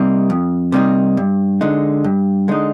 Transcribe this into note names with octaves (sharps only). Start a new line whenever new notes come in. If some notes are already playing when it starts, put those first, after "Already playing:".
Already playing: C3 G3 A#3 D#4
F2
C3 G3 A#3 D#4
G2
D3 G#3 D#4
G2
D3 G#3 D#4